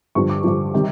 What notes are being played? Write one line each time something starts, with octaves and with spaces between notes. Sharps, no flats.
G2 D3 F3 C#6
D6
G2 D3 F3
C3 D#3 G3